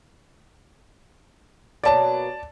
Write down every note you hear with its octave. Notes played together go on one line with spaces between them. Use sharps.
B2 F#3 A#3 D5 A5